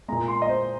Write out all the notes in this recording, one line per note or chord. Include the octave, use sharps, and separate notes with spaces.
A#2 G#3 A#5
C6
D#5
C5